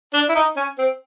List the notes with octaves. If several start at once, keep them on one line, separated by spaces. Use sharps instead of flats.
D4
E4
D#4
C#4
C4